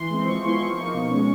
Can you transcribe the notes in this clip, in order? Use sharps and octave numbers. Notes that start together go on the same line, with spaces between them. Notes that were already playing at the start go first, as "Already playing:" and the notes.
Already playing: E3 C6
G#3 C4
F3 C#6
G#3 B3 E4 C6
F3 C#6
A#3 D#4
B2
G#3 C#4